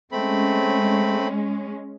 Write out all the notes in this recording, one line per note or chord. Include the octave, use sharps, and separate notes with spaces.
G#3 A3 C4 C#4 B5